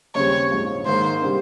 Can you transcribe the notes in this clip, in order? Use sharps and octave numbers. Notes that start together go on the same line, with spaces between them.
D#2 C#3 G3 C4 C#5
A#1 G#2 F3
G#2 D#3 A#3 C5
C3 G3 C4